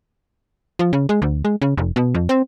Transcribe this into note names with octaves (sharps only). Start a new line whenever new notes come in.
F3
C#3
G#3
D2
G#3
C#3
F1
B2
F2
C4